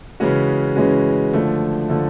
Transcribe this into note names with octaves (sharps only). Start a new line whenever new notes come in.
C#3 E3 G#3 C#4 F#4
C#3 E3 G#3 C#4 F#4
D3 F3 A3
D3 F3 A3